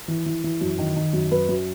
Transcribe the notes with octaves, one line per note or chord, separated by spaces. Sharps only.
E3
E3
E3
F#2
D#3
D#3
F#2
F#2 B4
F#2